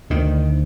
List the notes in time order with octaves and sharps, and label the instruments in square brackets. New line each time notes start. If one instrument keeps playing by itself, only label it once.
[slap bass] D2 D3 D#3